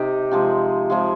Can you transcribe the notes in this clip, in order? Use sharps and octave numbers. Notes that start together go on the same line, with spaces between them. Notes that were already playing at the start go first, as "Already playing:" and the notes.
Already playing: C3 D#4 G4
C3 F3 G#3
C3 F3 G#3